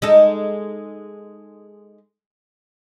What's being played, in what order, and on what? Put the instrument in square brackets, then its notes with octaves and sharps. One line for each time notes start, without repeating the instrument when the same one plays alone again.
[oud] G#3 D#4 A4